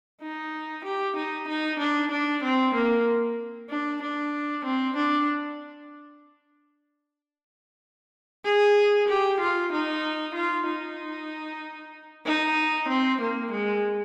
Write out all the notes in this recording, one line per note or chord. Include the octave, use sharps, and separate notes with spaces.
D#4
G4
D#4
D#4
D4
D4
C4
A#3
D4
D4
C4
D4
G#4
G4
F4
D#4
F4
D#4
D#4
C4
A#3
G#3